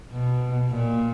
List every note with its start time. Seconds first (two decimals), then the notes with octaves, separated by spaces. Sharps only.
0.11 B2
0.70 A#2